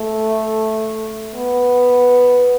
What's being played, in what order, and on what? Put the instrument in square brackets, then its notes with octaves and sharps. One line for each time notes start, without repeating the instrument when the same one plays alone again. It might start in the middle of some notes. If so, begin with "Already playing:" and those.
Already playing: [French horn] A3
B3